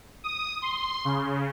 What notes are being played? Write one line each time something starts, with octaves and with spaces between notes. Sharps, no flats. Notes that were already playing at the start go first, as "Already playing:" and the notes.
D#6
C6
C#3